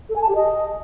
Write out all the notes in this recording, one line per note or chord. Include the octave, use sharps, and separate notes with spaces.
A4
G#5
A5
G4
D#5